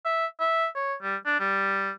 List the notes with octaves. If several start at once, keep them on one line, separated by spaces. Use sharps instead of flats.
E5
E5
C#5
G3
D4
G3